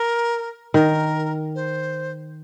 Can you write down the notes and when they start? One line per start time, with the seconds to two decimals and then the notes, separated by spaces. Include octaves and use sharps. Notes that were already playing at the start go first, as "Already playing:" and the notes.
Already playing: A#4
0.74 D#3 A#4
1.55 C5